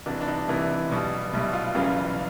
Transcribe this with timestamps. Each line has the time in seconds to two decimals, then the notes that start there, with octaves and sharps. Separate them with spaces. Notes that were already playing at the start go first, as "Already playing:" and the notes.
0.06 C2 C3 E3 D4
0.21 D4
0.28 D#4
0.48 C2 C3 E3 E4
0.90 B1 B2 G3
1.33 B1 B2 G3 E4
1.53 F4
1.74 F#1 F#2 C#3 E3 G3 F4